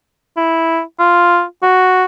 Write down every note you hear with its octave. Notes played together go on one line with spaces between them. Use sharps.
E4
F4
F#4